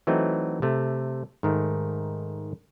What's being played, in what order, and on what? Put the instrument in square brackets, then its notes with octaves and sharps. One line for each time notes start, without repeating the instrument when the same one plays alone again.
[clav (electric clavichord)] E3 F#3 A3 C4 D#4
C3 A3
G#2 D#3 A3